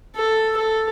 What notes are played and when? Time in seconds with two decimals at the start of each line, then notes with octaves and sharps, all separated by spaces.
0.15 A4
0.56 A4